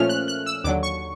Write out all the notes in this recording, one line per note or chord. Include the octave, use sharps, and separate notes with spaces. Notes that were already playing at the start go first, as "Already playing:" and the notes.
Already playing: A#2 F3 A3 C#4 F6
F#6
F#6
E6
D#2 D3 F#3 D6
C#6